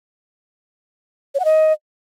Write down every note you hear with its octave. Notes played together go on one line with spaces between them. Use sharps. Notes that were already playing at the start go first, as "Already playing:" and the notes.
C#5
F#5
D#5